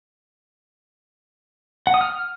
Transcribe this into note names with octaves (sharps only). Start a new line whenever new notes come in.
F#5
D#6
F6